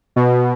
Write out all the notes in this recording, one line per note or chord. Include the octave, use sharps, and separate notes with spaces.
B2